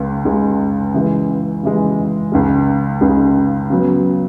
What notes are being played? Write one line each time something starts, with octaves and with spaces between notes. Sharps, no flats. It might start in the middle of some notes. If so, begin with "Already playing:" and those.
Already playing: C#2 C#3 G#3
C#2 C#3 G#3
C#3 E3 G#3
C#3 E3 G#3
C#2 C#3 G#3
C#2 C#3 G#3
C#3 F#3 B3